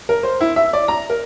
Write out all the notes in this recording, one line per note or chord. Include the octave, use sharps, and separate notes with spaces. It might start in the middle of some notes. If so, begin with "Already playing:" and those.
A#4
C5
E4
E5
D5
A#5
A#4